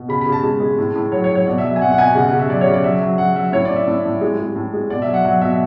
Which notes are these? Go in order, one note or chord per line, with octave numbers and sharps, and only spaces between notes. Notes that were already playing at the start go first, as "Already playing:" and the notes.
Already playing: B2
C#3 B5
B5
C#3
A5
G#3
G#3
A2
A2
F#3 C#5
C#5
F#3
C#5
B2 D5
E5
F#3
E5
G#5
B2 F#5
F#5
B2 G#5
C#3 F#5
F#5
C#3
E5
F#3 D5
C#5
C#3
D5
F#3 E5
F#3
F#3 F#5
F#3 E5
A2 C#5
D5
A2
E5
A2 E5
A2
G#3
G#3
A2
G#3
B2 D5
E5
F#3
F#5
F#3 F#5
B2 E5